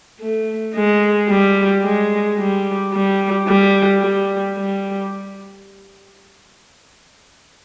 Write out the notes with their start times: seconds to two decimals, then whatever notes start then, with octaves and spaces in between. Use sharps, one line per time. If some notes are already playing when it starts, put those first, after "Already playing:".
0.21 A3
0.75 G#3
1.29 G3
1.84 G#3
2.39 G3
2.93 G3
3.48 G3
4.02 G3
4.57 G3